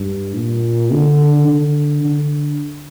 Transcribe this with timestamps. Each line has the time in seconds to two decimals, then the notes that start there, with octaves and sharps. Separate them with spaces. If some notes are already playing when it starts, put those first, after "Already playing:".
Already playing: G2
0.36 A#2
0.92 D3
1.47 D3
2.04 D3